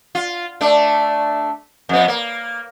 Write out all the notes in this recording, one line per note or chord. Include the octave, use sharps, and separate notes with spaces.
F4
A3 D4
F2 B3
A#3